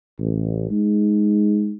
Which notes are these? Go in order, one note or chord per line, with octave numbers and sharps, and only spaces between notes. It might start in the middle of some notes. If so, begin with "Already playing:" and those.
A1
G#3 D#4